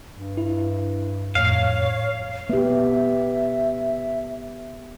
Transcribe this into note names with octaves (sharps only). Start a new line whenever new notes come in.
G2
E4
F2 A2 C#5 F5
B3 G4 E5